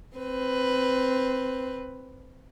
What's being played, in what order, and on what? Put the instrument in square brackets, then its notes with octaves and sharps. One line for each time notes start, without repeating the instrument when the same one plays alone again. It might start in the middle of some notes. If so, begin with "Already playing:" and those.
[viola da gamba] C4 B4